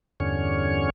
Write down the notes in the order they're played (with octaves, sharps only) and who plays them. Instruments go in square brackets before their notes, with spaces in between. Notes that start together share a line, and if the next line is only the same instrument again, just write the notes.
[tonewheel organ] E2 G2 D3 C#4 C#5